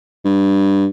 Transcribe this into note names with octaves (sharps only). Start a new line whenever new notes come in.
G2